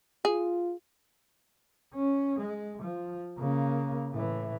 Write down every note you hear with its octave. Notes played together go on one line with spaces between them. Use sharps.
F4 G#4
C#4
G#3
F3
C#3 A#3
A2 E3